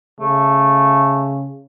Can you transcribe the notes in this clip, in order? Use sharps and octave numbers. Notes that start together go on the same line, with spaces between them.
C#3 A3